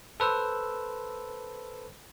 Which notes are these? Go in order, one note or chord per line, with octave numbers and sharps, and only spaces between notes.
A4 B4 C5 E6